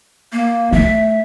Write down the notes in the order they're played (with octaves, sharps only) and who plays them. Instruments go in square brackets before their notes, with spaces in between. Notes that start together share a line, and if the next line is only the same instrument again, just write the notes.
[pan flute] A#3
[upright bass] A3 [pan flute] E5